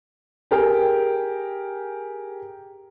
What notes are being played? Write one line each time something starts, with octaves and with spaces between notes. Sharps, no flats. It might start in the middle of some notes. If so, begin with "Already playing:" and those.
G4 G#4 A#4 G5